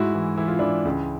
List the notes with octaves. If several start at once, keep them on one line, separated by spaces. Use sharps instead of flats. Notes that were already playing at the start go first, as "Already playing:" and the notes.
Already playing: G#2 E4 F#4
E3
E3 E4
F4
E3 D4 E4
C#2